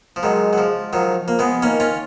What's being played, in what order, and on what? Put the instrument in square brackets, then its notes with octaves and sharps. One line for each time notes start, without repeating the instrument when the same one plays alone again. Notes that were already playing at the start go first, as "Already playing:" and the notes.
[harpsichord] F3
[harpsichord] D#3 F#3 [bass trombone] G#3
[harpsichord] F#3
F3
[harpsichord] D#3 F#3 [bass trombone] F3
[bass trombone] F3 [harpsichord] A#3
[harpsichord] G#3 B3
[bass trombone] D#3 [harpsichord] A#3 C#4
[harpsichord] C#4 F4